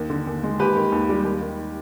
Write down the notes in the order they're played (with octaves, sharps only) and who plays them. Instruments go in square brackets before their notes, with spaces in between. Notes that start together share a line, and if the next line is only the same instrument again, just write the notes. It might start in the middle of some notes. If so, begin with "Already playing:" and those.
Already playing: [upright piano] D#2
D3
D#2
G#3
D#2 G4 B4
D#3
D#2
G3
D#2
D#3